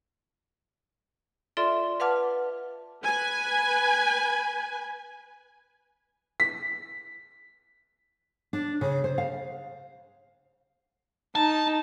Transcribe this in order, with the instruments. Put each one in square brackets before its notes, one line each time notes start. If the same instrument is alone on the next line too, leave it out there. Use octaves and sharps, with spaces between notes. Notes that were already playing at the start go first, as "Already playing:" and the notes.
[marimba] F4 A4 D5 E5 C6
B4 F5 F#5 A5 D6 F6
[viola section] B4 G#5
[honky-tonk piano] B6
[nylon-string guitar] D4
C#3
C5
F5
[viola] D#4 [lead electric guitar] A5